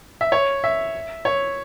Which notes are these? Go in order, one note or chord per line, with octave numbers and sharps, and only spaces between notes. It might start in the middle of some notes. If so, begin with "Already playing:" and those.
E5
C#5
E5
C#5